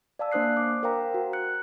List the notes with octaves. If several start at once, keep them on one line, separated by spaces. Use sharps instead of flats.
D5 F5 A5 E6
A#3 D4 C5 D#6 F#6 C7
D6
A#4 C5 F5 G5 A#5
F#4
F#6 C#7